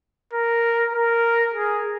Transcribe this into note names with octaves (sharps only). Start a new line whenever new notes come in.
A#4
A#4
G#4